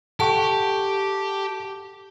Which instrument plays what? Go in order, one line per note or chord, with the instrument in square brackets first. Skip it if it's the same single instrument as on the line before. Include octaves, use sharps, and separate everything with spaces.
[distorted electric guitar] G4 [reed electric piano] A4 F#5 C#6 [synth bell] A5